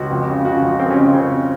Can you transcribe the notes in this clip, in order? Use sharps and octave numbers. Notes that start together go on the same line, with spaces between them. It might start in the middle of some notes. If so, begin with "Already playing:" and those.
Already playing: C#2 F#4
F2
C#3
C#3 F#4
F2
F2 C4
C#4
C#3 C4
C#3 C4